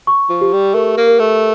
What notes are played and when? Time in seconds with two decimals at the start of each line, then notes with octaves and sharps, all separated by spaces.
0.07 C#6
0.30 F3
0.41 G4
0.53 G3
0.74 A3 A#4
0.97 A#3
1.08 A#4
1.19 A3